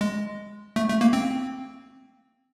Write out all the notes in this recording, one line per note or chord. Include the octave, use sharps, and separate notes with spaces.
G#3
A3
A3
A#3
C4